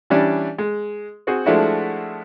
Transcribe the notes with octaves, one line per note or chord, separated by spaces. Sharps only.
E3 G3 C#4 D4
G#3
C4 F#4 G#4 C5
F3 G#3 A3 D4 E4 F#4